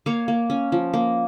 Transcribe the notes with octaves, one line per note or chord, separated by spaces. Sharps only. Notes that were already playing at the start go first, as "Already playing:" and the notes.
A#3 C#5 F5
A#3
C#4
F3
A#3